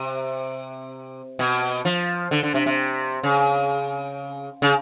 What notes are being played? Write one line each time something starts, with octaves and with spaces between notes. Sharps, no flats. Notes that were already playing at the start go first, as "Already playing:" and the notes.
Already playing: C3
B2
F3
D3
D3
C3
C3
C#3
C#3